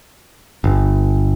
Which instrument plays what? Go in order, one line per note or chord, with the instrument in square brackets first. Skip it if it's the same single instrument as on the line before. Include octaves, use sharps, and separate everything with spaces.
[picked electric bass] G1